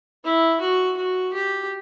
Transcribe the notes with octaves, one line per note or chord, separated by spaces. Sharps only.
E4
F#4
F#4
G4